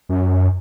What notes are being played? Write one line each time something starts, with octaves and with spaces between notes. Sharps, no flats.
F#2